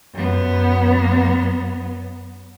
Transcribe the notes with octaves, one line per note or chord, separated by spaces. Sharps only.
F#2 B3